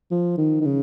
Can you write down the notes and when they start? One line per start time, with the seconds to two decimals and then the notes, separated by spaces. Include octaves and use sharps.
0.11 F3
0.38 D#3
0.61 D#3
0.65 C#3